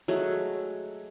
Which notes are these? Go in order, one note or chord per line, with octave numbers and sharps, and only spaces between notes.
F#3 G#3 A3